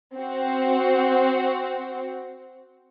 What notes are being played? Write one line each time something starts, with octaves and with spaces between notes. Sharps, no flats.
C4 F#4